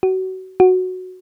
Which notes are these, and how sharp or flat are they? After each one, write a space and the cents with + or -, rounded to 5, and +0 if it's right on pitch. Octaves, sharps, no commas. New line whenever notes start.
F#4 +25
F#4 -5